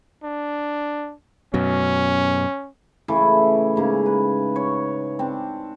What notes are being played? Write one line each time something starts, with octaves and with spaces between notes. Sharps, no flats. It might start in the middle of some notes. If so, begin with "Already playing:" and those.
D4
F#2 B2 C#4
C#3 E3 A3
G#2 C#3 A#3
B4
C#5
C4 D4